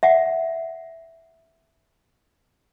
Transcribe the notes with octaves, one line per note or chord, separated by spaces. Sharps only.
E5 F#5